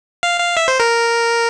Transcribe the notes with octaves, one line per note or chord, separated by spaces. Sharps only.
F5
F5
E5
C5
A#4